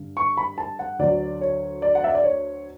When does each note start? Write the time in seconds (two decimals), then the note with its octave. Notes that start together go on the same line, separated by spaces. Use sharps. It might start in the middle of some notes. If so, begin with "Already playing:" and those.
Already playing: G2 D3
0.17 C#6
0.37 B5
0.58 A5
0.79 F#5
0.99 D2 D3 F#3 D5
1.41 C#5
1.82 D5
1.95 F#5
2.04 E5
2.15 D5
2.24 C#5